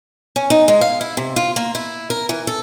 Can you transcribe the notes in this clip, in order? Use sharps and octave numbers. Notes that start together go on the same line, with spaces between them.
C#4
D#4
G#3
F5
E4
C3
F4
A#3
E4
A#4
E3
A4